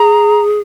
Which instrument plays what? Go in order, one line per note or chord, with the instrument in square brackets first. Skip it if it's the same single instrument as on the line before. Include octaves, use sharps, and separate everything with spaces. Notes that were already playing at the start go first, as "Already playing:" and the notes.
Already playing: [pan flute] G#4 [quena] A#5